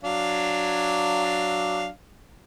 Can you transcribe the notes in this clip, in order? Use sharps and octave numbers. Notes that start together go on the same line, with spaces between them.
F#3 D4 F5